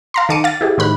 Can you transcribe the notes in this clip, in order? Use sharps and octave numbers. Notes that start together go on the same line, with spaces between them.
F5 A#5 C6
D#3 A4 D6 C#7 D#7
F5 D6 A6
E4 G4 G#4
A2 D#3 B5 F#6